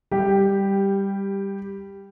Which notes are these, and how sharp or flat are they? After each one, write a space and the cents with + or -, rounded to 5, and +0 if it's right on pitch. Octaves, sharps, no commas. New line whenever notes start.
G3 +10 G4 +0